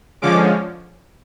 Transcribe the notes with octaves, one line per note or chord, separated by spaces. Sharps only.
D3 F3 G#3 C#4 D6